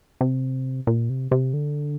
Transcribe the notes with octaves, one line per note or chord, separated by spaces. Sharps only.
C3
A#2
C3
C3
D3